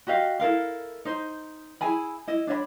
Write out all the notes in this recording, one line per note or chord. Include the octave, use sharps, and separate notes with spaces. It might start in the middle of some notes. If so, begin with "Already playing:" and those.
F#4 G4 D#5 F5
E4 A4 A#4 F5
D#4 C5
E4 G#4 G#5 B5
E4 D#5
D4 C#5 E5 B5